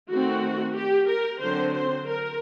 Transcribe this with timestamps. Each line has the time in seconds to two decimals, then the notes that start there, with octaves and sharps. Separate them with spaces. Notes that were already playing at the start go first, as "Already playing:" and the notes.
0.11 D#3 A3 C4 F#4
0.76 G4
1.09 A#4
1.41 D3 F#3 C4 C5
1.74 C5
2.07 A#4